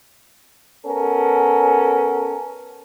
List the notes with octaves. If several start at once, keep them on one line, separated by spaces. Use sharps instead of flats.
B3 C#4 A4 A#4